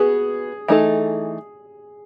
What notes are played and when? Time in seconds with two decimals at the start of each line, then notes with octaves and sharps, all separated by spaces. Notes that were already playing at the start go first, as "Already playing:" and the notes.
Already playing: B3 F#4 G#4 B4
0.68 E3 A3 D#4 A4